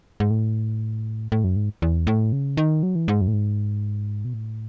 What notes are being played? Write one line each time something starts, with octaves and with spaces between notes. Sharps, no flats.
G#2
A2
A2
F#2
G#2
E2
A2
C#3
D#3
F#3
E3
G#2
F#2
A2
G#2
B2
A2